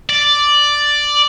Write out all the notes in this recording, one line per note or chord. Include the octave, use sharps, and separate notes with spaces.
D5